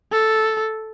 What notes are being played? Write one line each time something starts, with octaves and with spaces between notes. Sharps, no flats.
A4